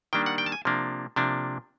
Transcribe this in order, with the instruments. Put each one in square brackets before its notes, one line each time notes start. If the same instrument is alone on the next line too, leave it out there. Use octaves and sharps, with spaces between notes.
[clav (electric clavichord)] D#3 G3 A#3 D4 G5
F#5
G5
A5
G#5
C3 F3 A#3 D4
C3 F3 A#3 D4